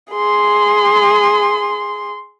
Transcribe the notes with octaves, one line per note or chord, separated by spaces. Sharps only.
G#4 C6